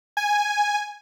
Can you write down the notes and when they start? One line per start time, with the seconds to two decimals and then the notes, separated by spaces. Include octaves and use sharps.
0.17 G#5